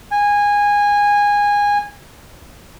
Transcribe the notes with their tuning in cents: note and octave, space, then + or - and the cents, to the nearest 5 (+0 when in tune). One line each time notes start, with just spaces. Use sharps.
G#5 -20